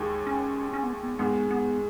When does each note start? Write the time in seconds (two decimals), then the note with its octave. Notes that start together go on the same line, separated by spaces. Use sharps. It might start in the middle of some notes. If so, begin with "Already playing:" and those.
Already playing: D#2 D#3 G#3
0.27 C#4
0.74 C#4
0.83 B3
0.93 A#3
1.03 B3
1.19 G#2 D#3 G#3 B3
1.51 B3